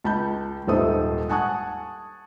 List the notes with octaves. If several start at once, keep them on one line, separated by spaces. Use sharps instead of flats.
C#2 A5 B5 G6
D#1 G#2 A4 C5 E5 D#6
F#5 G#5 A5 C#6 D#6 F#6